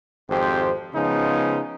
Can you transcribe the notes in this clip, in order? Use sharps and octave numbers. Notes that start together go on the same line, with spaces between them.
G#1 F2 G4 C5
C#3 F3 G#3 B3 D#4